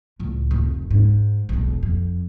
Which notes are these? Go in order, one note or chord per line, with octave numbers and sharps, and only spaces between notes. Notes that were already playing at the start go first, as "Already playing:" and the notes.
C#2 A2
F1
G#2
E1 B1
F2